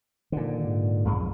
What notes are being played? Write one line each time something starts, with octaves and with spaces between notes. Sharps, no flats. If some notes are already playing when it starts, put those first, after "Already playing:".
A#2 D3 D#3
G#2
B1 F2 G#3